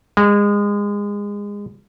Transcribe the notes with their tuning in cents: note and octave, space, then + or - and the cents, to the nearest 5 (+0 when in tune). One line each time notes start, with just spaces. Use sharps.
G#3 -25